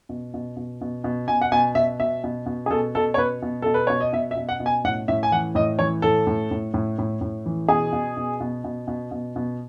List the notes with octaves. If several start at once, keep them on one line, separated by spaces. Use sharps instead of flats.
B2
B2
B2
B2
B2
B2 G#5
F#5
B2 G#5
B2 E5
B2 E5
B2
B2
G#4
B2 A4
B2 A4
C#5
B2 B4
B2
B2 A4
B4
B2 C#5
D#5
B2 E5
E5
B2
F#5
B2
G#5
A2 F#5
A2 E5
G#5
E3 F#5
A2 D#5
E3 C#5
A2 A4
A2
A2
A2
A2
A2
E3
B2 G#4
B2
B2
B2
B2
B2
B2
B2